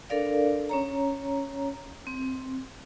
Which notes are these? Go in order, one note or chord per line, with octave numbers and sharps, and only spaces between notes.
D4 A4 A#4 D5 F5
C#4 C#5 A#5
C4